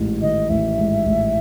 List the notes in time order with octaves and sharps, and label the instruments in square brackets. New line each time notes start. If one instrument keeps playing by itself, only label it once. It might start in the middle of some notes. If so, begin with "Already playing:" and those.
Already playing: [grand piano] A1 G#2
[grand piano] D#3 [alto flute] D#5
[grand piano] A1 [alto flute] E5
[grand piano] G#2
A1